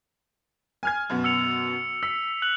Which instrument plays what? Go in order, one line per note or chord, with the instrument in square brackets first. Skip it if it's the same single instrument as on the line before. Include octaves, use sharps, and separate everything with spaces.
[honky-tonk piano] G#5 F6 G#6
F#2 B2 B3
[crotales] E6 C#7 F7
[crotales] E6 [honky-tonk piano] B6
[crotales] F#6 F#7